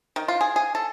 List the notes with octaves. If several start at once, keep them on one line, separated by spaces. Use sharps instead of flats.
D#3
F4
G#4
G#4
A4